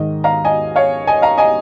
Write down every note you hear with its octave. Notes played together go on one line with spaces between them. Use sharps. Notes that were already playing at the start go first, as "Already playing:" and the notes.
Already playing: G#2 D#3 D#5
F5 A#5
D#5 G#5
C#5 F5
D#5 G#5
F5 A#5
D#5 G#5